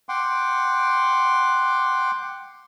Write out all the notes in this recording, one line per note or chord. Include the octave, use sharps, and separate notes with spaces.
F#5 G5 C6 D6